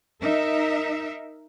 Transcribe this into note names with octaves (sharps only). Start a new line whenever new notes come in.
D#4 A#4 E5